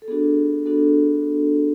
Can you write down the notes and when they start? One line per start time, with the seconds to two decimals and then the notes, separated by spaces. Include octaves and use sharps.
0.02 A4
0.08 B3 D4 F#4 G#4
0.66 B3 D4 F#4 A4